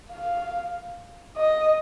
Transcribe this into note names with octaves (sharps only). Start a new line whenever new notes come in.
F5
D#5